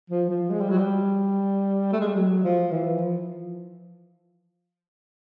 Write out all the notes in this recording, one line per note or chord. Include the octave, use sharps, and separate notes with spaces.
F3
F3
G#3
G3
F#3
G3
A3
G#3
G3
F#3
F3
E3
F3